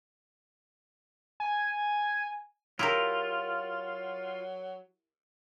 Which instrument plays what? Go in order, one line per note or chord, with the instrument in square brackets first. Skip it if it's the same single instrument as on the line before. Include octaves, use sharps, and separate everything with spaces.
[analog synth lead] G#5
[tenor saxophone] F#3 [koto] E4 G4 A#4 [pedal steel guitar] F4